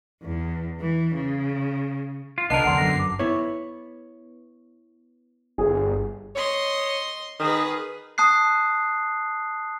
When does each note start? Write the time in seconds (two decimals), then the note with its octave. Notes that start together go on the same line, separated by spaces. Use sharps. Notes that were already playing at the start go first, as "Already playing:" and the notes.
0.22 E2
0.80 E3
1.15 C#3
2.38 F4
2.50 C2 D3 B3 A#4 D#5 A5 C7
2.64 C2 F2 F#5 C6
2.78 G1 F#2 A#6
2.99 D6
3.19 B3 E4 C#5
5.58 G1 G#4
6.35 C#5 D#5 C6
7.40 D#3 G#4 B4
8.18 A5 D#6 F#6 C7